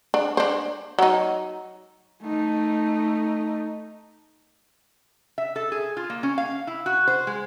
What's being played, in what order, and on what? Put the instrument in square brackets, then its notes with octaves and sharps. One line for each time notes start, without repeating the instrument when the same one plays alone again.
[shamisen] D4
D4 C5
F#3 D#4
[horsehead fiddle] A3 D#4
[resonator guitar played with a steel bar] E5
A4
G#4
F4
A#3
C#4
F5
E4
F#4
C5
G#3